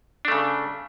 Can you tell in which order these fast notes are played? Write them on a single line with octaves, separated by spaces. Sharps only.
D4 A3 C#3